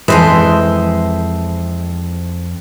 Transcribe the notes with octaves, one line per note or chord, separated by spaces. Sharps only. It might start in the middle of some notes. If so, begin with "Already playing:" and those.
F2 E3 G#3 C5 E5